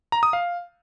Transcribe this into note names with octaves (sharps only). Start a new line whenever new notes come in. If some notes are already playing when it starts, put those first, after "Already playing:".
A#5
D#6
F5